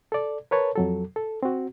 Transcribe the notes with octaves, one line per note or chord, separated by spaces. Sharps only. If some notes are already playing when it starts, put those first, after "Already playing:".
A4 D5
A#4 B4 C#5 A5
F2 F#3 A4
A4
C4 F#4